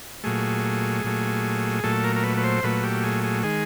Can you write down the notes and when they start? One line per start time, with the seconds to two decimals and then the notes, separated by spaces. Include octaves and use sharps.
0.24 A#2 F#3 A3 G#4
1.04 A#2 F#3 A3
1.83 A#2 F#3 A3 A4
2.04 A#4
2.16 A#4
2.23 B4
2.37 B4
2.44 C5
2.63 A#2 F#3 A3 B4
2.83 G4
3.03 G#4
3.24 G#4
3.43 D#3 G#3 G#4